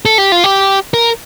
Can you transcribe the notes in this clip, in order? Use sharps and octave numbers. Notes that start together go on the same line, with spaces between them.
A4
G4
F4
G4
A#4